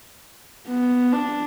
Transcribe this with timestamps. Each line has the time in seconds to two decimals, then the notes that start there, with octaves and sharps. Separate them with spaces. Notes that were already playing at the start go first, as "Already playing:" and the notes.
0.67 B3
1.13 D4